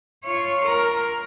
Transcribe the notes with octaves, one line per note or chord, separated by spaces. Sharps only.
F4 C#5
A#4